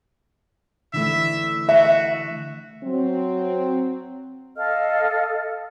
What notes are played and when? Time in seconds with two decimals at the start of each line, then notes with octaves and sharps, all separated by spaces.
0.94 D3 E3 A3 E5
1.69 F#4 E5
2.83 F#3 C4
4.55 A4 D#5 F5 F6